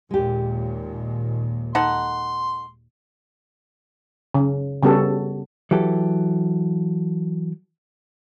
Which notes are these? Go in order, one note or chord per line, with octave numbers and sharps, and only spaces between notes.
D#2 A#2 G#3 G4
D#4 A4 F#5 C6
C#3
C#3 G3 B3 F#4 A4
E3 F#3 G4 A4